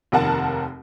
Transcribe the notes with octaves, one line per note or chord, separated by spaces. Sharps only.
F1 D#2 A#4 F#5 A5